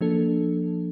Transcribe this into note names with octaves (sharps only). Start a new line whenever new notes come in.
F3 A#3 D4 A4